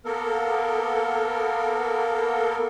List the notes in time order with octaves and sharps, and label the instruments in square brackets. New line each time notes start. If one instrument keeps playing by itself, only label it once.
[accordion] A#3 B3 A4 A#4